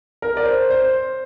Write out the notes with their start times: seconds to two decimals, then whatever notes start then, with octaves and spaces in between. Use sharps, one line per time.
0.22 A#4
0.37 D5
0.46 C5
0.70 C5